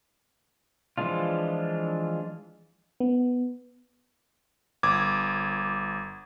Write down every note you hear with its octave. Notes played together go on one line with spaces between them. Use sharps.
E3 F3 G#3 D4 F4
B3
G1 D6 G#6